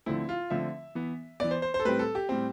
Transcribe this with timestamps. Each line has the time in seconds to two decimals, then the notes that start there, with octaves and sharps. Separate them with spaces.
0.06 D3 F3 A3 C4 E4
0.29 F4
0.50 D3 F3 A3 C4 E5
0.95 E3 B3
1.40 E3 B3 D5
1.51 C5
1.62 C5
1.74 C5
1.80 A4
1.85 A2 G3 C4 B4
1.99 A4
2.15 G4
2.29 A2 G3 C4